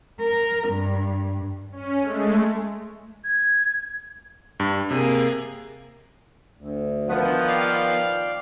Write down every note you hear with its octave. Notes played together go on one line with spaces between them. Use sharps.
A#4
G2
C#4
G#3 A3
G#6
G2
C3 A#3 G#4
D2
D#3 F3 B3
D5 F5 G5